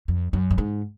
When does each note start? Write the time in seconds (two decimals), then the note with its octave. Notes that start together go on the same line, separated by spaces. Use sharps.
0.08 F2
0.33 F#2
0.51 G2
0.58 G#2